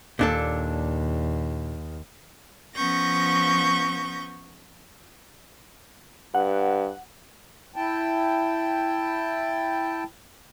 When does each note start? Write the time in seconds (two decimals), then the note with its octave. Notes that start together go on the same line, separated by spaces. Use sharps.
0.19 D#2 A#2 D4 A4
2.75 F3 B3 C#4 C#6 G6 A#6
6.34 G2 F#5
7.76 E4 G5 A5